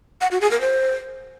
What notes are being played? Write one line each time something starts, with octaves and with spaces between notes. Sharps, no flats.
F#5
F#4
G#4
A#4
C5